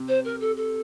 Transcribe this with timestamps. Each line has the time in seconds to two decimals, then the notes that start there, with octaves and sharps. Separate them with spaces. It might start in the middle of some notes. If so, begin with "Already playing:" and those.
Already playing: C3
0.08 C5
0.25 A#4
0.40 A4
0.57 A4